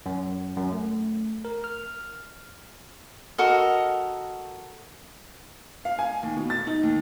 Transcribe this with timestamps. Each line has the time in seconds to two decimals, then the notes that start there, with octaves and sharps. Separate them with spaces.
0.06 F#2
0.56 F#2
0.73 A3
1.45 A#4
1.64 F6
3.38 F#4 A4 A#4 D#5
5.85 F5
5.99 G#5
6.23 D#2
6.37 B2
6.50 A6
6.67 D#4
6.83 D#2